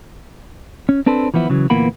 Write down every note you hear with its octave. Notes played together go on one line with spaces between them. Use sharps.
C#4
C4 D4 A4 B4 C5
E3 F3 B3 E4
C#3 E3 F#3
D2 A#2 E3 A#3 B3 B5